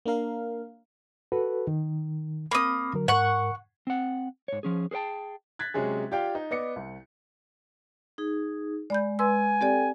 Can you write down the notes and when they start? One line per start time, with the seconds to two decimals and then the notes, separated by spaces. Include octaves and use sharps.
0.06 A#3 D4 A#4 F5
1.32 F#4 A4 B4
1.67 D#3
2.51 A#3 C4 B5 D#6
2.93 D3 F#3 A#4
3.08 G#2 A#4 F#5 C#6
3.87 C4 F#5
4.48 G#2 C#5
4.63 F3 C#4 G#4
4.91 G#4 A4 C5 G5 A5
5.59 F#6 G#6 A6 B6
5.74 C3 F#3 G#3 C#4 G#4
6.11 F4 G4 D5 F5 G5
6.35 D#4
6.51 B3 D5 D#5 D6 C#7
6.76 C2
8.18 D#4 G#4
8.90 G#3 D5 B5 G6
9.19 B4 G#5 C6 E6
9.61 C4 G4 A4 D5 G5